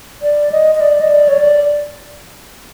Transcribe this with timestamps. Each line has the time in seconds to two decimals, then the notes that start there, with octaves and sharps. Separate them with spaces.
0.22 D5
0.52 D#5
0.75 D#5
0.81 D5
1.01 D#5
1.10 D5
1.28 C#5
1.39 D5